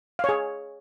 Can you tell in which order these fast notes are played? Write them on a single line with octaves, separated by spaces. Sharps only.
F5 C#5 G#4